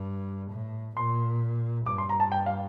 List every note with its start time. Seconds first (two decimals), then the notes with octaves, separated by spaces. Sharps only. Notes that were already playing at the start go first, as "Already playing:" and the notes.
Already playing: G2
0.51 A2
0.96 A#2 C6
1.86 G2 D6
1.98 C6
2.09 A#5
2.20 A5
2.32 G5
2.46 F5